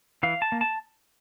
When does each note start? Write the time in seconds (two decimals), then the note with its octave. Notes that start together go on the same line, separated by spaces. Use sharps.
0.23 E3 F5
0.42 A5
0.52 A#3
0.61 A5